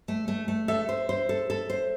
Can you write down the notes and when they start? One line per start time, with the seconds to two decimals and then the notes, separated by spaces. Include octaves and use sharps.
0.08 A3
0.28 A3
0.48 A3
0.68 A4 E5
0.89 C5
1.09 C5
1.29 A4
1.50 A4
1.70 C5